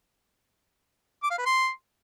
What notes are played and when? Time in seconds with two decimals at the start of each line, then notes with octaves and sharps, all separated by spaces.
1.23 D6
1.31 F5
1.38 B4
1.46 C6